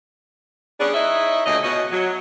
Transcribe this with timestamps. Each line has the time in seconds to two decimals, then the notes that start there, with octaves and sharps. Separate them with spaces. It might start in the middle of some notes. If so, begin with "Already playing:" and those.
0.80 G3 B3 C#4 D4 G#4 D5
0.94 D#4 E4 C#5 D#5 E5
1.46 D2 A#2 C#3 D#5
1.63 B2 C#4 D#5
1.92 F#3